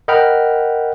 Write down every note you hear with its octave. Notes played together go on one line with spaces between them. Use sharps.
A#4 D#5 F#5 G5 B5 F6